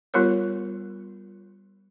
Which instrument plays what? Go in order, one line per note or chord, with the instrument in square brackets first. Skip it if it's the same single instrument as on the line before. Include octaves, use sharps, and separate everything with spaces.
[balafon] G3 B3 F4 G4 A#4 C#5